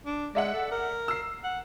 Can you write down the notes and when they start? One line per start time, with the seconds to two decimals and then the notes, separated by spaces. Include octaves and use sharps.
0.06 D4
0.35 G#3 D5 E5 F#5
0.54 A4
0.71 A#4
1.08 E6 C7
1.44 F#5